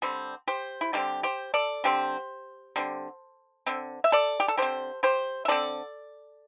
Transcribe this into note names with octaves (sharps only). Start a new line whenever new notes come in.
D3 G3 C4
G4 C5
E4
D3 G3 C4 G4
G4 C5
A4 D5
D3 G3 C4 G4 C5
D3 G3 C4
D3 C4
E5
A4 D5
G4
A4
D3 C4 G4 C5
G4 C5
E5
D3 C4 A4 D5